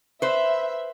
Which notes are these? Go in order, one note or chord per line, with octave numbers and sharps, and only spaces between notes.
B4 C5 E5